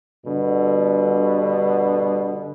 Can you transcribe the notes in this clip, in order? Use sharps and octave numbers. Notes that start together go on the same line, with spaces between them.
G2 B2 D3